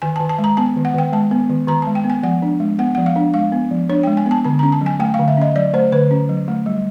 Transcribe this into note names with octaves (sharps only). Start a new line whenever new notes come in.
D#3 G#5
A5
D#3
A5
G#3
A#5
B3 A5
D#3
F#5
D#3 G5
G#3 A5
B3
D#3
D#3 A#5
A5
G#3
G5
B3
G#5
F3 F#5
D4
G#3
B3 F#5
F3 F#5
F5
D4
G#3 F5
B3
F3
D4 C#5
G5
G#3
G#5
B3 A5
D3 A5
A#5
C#4
A5
F#3
G#5
A3 G5
F5
D3
E5
C#4 D#5
F#3 D5
A3 C5
D3 B4
C#4
F#3
A3
G3